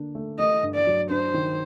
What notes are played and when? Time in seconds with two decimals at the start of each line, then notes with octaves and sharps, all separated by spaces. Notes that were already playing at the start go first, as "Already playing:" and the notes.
Already playing: D3 A#3 D4
0.15 A3
0.39 A3 D#5
0.63 G2
0.75 D5
0.87 F#3
1.10 D4 C5
1.34 D#3